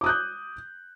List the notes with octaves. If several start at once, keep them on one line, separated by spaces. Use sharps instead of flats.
D6 D#6 F#6 G6